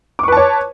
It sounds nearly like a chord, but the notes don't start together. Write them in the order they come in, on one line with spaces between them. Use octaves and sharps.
D6 C#6 B4 A5 C#5